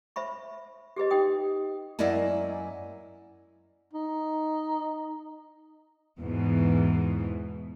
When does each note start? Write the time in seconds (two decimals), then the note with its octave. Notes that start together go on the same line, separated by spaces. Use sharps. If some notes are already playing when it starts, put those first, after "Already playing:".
0.16 C5 E5 B5 C#6
0.96 G4 G#4 B4 D#5
1.10 D#4 G4 G5 D#6
1.99 F#2 A#3 E4 D5 D#5 G#5
3.94 D#4
6.20 E2 G#2 B2 E3